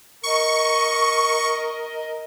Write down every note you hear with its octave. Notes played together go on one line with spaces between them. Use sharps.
A#4 D#5 C#6